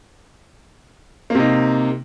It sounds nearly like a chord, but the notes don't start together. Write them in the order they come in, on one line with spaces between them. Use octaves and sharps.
A#3 C3 D#4